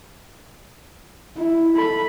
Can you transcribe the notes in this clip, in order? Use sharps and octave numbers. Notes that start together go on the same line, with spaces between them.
E4
A4 B5